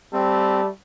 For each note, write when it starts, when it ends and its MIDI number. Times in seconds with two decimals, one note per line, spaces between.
0.13 0.69 55
0.13 0.67 57
0.13 0.61 60